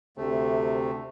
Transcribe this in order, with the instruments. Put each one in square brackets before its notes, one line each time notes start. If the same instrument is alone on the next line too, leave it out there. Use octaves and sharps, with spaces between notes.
[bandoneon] D2 A3 [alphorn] C3